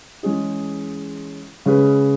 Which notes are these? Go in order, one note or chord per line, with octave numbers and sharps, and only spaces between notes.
E3 G#3 C#4 G#4
C#3 G#3 C#4 G#4 B4